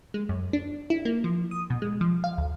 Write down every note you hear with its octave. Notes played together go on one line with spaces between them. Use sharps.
G#3
F#2
D4
E4
A#3
F3
D#6
B2
G#3
F3
F5
D2